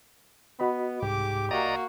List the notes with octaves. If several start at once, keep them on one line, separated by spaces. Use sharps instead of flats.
B3 F#4 D#5 B5
C2 G#2 G4 D6
A#3 F#4 D5 D#5 A#5